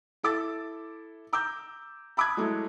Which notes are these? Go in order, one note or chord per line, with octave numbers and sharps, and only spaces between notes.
E4 A4 D6 E6 A6
A#5 D6 E6 G6
A5 B5 D6 D#6 F#6 G#6
F#3 G#3 A3 E4